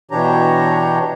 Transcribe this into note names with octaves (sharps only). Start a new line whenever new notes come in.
B2 E3 D4 G4 C#5 A#5